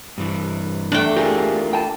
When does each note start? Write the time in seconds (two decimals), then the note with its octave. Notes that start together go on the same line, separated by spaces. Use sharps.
0.18 G2 E3
0.92 E2 A3 D4 G5
1.17 E4 F4 G4 G#4 A#4
1.73 G5 A5